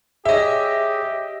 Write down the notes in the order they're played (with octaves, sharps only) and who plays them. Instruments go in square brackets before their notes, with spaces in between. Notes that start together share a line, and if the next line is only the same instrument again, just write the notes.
[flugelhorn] G4 [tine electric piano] G#4 C#5 [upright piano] D#5 E5